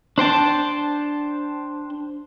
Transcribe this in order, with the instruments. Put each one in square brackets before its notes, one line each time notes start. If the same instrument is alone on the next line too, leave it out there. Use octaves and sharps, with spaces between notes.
[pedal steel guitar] D4 C5 G5 A5